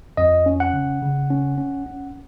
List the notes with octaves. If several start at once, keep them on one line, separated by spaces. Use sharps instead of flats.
F2 D#5
C#4
F#5
C#3
C#3
C#4
C#4
C#4